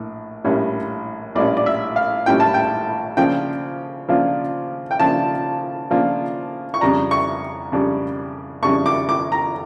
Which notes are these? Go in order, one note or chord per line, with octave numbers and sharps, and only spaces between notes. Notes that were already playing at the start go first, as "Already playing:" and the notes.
Already playing: A#1 A2
A#1 A2 G3 C#4 F4
A#1 A2 G3 C#4 F4 D5
D5
E5
F5
A#1 A2 G3 C#4 F4 G5
A5
G5
C#3 F3 A#3 D4 F4 G5
C#3 F3 A#3 D4 F4
G5
C#3 F3 A#3 D4 F4 A5
C#3 F3 A#3 D4 F4
C#6
F2 C#3 G3 D4 A#5
C#6
F2 C#3 G3 D4
F2 C#3 G3 D4 C#6
D6
D6
A#5